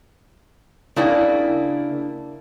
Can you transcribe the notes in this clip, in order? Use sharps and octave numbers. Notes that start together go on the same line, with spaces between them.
C#3 A#3 D4 E4 D5 G5